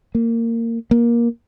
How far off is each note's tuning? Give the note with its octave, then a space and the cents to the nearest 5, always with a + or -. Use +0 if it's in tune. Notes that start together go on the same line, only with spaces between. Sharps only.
A#3 -20
A#3 +15